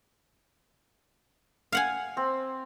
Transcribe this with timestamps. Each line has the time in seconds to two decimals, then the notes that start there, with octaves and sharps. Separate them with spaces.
1.72 F5 F#5 G#5
2.17 C4